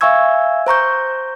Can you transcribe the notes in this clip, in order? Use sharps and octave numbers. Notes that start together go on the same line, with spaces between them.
E5 F5 G#5 C#6 E6 G#6
C5 A#5 C#6 G6